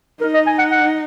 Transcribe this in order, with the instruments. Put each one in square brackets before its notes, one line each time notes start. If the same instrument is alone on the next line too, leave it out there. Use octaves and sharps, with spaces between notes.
[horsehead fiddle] D#4 [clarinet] A#4
[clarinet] D#5
G#5
F#5
F#5